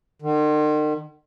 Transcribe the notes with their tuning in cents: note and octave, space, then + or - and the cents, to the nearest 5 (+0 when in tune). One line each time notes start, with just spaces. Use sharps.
D#3 -45